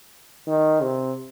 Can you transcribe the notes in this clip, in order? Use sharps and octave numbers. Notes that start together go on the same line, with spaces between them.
D#3
C3